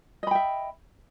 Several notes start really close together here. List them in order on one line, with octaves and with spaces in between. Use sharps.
D#5 B5 G5 E5